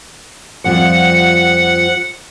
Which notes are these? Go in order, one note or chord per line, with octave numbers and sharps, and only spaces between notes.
F2 F3 G3 F#5